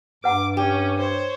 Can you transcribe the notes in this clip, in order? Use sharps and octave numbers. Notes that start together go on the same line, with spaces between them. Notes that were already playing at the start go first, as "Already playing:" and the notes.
G2 B4 F#5 A#5 D6
C#4 G4
C5 C#5